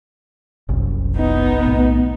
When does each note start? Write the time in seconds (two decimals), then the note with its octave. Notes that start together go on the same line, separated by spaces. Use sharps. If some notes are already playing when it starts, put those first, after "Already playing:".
0.69 F#1 C2
1.16 B3 D#4
1.62 B1 A2